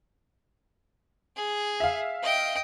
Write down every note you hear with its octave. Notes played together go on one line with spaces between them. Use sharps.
G#4
E5 F5
D#5 G5